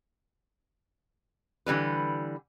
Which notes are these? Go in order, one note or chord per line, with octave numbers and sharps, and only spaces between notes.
D3 E3 G3 B4